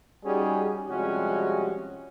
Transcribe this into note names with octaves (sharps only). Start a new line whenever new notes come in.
G3 C#4 D#4 F#4 G#4
C3 F3 G3 G#3 C#4 F#4